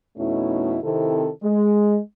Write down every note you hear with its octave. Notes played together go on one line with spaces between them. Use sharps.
F2 B2 A3 C#4 D#4 E4
C3 D#3 C4 E4 A4
G#3